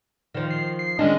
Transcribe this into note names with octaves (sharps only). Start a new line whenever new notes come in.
D#3 F3
C7
C7
D#3 G#3 C#4 D4 D#5